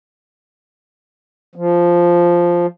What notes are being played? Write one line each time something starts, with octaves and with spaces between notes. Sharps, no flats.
F3